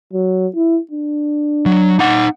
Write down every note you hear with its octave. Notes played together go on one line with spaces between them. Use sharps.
F#3
E4
D4
F#3
D#4 F#5